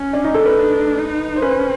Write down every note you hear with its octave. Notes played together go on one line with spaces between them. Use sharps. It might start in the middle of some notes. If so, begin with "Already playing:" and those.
Already playing: C#4
D4
D#4
A4
B4
D4
D#4
C5
C#4 B4